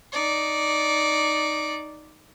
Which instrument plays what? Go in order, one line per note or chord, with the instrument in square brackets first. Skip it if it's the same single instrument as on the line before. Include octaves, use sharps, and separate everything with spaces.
[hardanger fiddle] D#4 D5